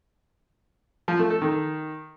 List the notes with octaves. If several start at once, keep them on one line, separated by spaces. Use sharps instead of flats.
F3
A3
A4
D#3